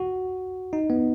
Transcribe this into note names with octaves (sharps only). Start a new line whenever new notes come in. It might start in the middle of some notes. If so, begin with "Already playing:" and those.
Already playing: F#4
D#4
B3